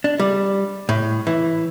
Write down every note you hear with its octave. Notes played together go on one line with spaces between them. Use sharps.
D4
G3
A2
E3